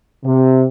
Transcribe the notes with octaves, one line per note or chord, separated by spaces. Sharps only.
C3